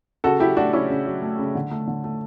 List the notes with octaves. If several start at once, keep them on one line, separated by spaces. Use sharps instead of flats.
C#3 F#4 A4
F#3 E4 G4
A3 D4 F#4
C#3 C#4 E4
C#3
F#3
A3
C#3
D3
A3
D3
A3